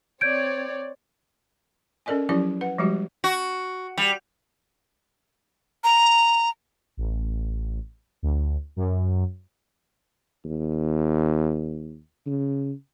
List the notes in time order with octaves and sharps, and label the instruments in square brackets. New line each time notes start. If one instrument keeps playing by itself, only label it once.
[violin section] C4 C#5 D5 [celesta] G6 G#6 D7
[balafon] C#4 A4 A#4 D5 D#5 G#5
F3 F#3 C#4 E4 G4 D5
B4 F#5
F3 G3 G#3 F#4 G4
[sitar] F#4
G3
[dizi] A#5
[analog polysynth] A1
D2
F#2
[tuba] D#2
C#3